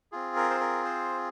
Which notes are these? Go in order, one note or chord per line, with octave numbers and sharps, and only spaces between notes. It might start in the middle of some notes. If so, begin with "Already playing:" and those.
C4 F4 G#4
A#4
C5
A#4
C5